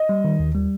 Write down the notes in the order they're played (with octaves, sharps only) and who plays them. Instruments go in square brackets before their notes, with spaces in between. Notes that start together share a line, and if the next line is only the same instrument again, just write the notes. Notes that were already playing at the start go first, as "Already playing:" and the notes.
Already playing: [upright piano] D#5
[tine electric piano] G3
D#3
D#2
G3